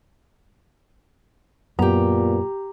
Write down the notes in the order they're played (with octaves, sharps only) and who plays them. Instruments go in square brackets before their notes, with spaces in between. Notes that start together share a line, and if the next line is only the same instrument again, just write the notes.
[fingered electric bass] F#2 [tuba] A#2 [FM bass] B3 [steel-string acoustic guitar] G4 A#5